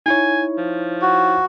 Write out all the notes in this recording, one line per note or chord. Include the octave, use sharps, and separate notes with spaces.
D#4 E4 C#5 G#5
F3
F#4